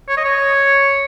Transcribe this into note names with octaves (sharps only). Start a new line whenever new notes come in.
C#5
D#5
C#5